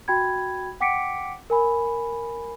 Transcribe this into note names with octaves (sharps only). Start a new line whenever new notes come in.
F#4 G5 B5 G#6
F#5 G5 D6 B6 C#7 D7
A#4 G#5 B5